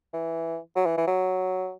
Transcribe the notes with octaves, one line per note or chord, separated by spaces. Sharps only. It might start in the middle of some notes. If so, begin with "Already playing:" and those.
E3
F#3
E3
E3
F#3